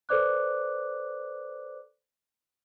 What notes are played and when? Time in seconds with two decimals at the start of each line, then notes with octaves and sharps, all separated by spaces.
0.09 A4 B4 C5 D5 D6 F#6